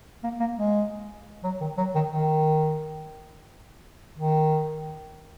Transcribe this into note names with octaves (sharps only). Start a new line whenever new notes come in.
A#3
A#3
G#3
F#3
D#3
F#3
D#3
D#3
D#3